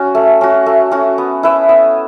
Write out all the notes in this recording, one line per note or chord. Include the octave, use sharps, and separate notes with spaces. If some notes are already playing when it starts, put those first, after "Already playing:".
Already playing: C#4 F#4
A3
C#4 F#4
A3
C#4 F#4
B3
E4 B4 E5
B3